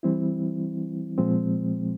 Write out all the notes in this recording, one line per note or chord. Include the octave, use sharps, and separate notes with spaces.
E3 G3 C4 E4
A#2 F3 G#3 C4